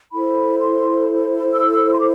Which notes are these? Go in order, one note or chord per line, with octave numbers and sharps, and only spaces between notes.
E4 A4 C5 B5
C6
E6
C6
D6